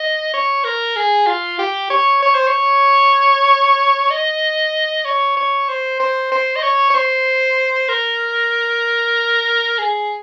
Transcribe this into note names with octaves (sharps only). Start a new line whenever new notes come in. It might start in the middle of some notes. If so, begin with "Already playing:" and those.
Already playing: D#5
C#5
A#4
G#4
F4
G4
C#5
C#5
C5
C#5
D#5
C#5
C#5
C5
C5
C5
D#5
C#5
C#5
C5
A#4
G#4